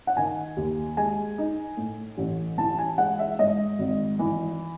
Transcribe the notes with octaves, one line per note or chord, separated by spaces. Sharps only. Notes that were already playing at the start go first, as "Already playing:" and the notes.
F#5
D#3 G#5
D#2
G#3 G#5
D#4
A2
A1
E3 A5
G#5
G#3 F#5
E5
G#2 D#5
G#1
E3